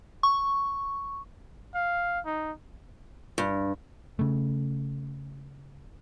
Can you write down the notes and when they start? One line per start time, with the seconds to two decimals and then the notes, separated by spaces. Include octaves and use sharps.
0.23 C#6
1.75 F5
2.25 D#4
3.38 G2
4.19 C#3 A3